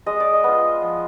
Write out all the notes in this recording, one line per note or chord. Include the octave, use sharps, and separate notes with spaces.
G#3 D#5
D5
D#5
B3 F4
F3